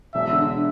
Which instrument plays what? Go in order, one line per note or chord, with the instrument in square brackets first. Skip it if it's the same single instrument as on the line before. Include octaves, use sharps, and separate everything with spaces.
[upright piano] E1 [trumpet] E5
[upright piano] D3